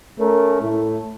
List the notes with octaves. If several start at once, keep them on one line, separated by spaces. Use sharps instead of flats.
A3 C#4 A#4
A2 A3 E4